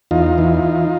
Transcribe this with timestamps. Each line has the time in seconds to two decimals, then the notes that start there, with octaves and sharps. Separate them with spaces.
0.11 E2 D#4 F4
0.38 E3